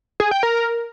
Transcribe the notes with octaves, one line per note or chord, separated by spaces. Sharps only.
G#4
G5
A#4